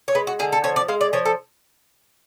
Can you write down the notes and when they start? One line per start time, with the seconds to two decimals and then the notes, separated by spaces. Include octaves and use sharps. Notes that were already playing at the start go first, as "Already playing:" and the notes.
0.08 C#5
0.15 G#3 B4
0.27 F#4
0.39 D3 G#4
0.52 A4
0.64 F3 C#5
0.76 D5
0.88 G#3 F5
1.01 D5
1.13 F3 C#5
1.25 A4